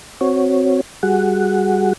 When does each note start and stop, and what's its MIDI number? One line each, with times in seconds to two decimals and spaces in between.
0.21 0.81 60
0.21 0.81 66
0.21 0.81 73
1.03 1.93 55
1.03 1.93 66
1.03 1.93 68
1.03 1.93 78